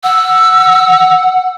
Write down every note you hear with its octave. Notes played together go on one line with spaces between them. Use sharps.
F#5 E6